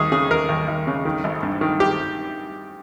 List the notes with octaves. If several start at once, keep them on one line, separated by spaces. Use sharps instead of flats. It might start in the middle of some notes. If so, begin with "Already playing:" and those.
Already playing: D#2 G#4
C#3 G#4
D#2 A#4
D#2
D#2
C#3
D#3
G#1
G2
D#3
G4